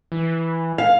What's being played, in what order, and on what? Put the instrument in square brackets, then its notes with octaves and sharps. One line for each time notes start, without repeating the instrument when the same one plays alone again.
[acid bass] E3
[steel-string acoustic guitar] F5